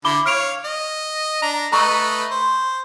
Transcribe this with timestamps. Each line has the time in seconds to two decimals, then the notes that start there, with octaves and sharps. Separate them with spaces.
0.05 D3 E4 B5 D6 G7
0.26 C#5 F5 F6 D7 F7
0.65 D#5
1.42 D4 A#5
1.72 A3 B4 D#5 A#5 C#6
2.31 C5